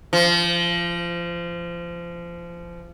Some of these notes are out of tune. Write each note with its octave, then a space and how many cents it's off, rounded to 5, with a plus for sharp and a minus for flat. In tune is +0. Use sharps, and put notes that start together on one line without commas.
F3 -25